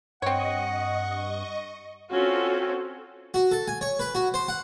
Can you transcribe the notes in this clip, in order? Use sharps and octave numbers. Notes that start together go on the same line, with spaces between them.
G2 C4 C#5 D#5 F#5 C#6
C4 C#4 F4 F#4 A4
F#4
A4
G#5
C#5
B4
F#4
C5
F#5